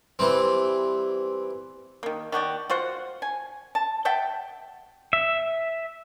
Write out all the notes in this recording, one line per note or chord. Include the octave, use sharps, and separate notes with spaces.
E3 G3 C4
D#3 A#3
D#3 F#4 G4 D5
F4 F#4 C5 F#5
G#5
A5
E5 F#5 G5 A5
E5